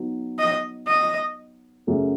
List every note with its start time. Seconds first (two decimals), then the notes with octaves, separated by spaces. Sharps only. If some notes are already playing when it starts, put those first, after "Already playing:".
Already playing: F#3 B3 D#4
0.39 D#5
0.87 D#5
1.87 F#2 C#3 F#3 A3 C#4